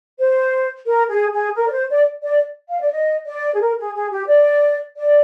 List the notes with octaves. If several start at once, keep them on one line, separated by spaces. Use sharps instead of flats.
C5
A#4
G#4
G#4
A#4
D5
C5
D5
D5
F5
D5
D#5
D5
G#4
A#4
G#4
G#4
G4
D5
D5